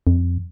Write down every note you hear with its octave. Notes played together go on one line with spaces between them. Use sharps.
F2